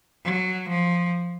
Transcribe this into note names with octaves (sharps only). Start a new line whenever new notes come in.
F#3
F3